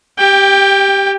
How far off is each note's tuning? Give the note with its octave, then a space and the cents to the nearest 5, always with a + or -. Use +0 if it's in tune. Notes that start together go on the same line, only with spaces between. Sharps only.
G4 +0 G5 +25